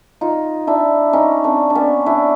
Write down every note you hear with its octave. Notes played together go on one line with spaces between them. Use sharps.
D#4 F4
D4 E4
C#4 D#4
C4 D4
D4
B3 C#4
D4 E4